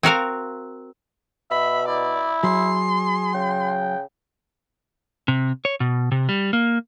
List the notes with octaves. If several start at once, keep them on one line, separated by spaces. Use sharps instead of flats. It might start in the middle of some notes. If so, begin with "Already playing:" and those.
C4 F#4 A#4 F5
B2 E5 B5
E4 D5
F#3 G#4 C6
C#3 G5
C3
C#5
B2
C3
G3
A#3